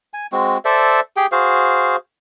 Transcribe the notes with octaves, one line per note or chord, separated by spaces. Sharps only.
G#5
G#3 C4 F#4
A4 C5 D5 E5
G4 G#4 G5
F#4 G#4 C5 F5